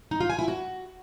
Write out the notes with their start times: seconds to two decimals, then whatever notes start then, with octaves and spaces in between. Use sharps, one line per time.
0.11 D#4
0.20 F4
0.30 G#5
0.39 E4
0.48 F#4